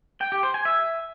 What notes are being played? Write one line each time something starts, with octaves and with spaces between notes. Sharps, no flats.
G5
G4
C5
G#5
E5